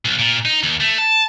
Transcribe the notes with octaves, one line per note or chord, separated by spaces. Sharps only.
B1
A#2
D#4
D#2
A3
A5